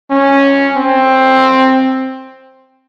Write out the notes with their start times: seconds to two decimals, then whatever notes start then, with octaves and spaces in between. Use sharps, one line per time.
0.11 C#4
0.76 C4